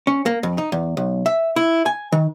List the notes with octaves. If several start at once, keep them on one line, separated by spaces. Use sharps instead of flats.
C#4
A#3
F2
D#4
E2
B1
E5
E4
G#5
D#3